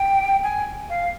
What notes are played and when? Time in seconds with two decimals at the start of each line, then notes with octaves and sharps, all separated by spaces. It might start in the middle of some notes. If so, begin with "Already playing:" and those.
Already playing: G5
0.44 G#5
0.90 F5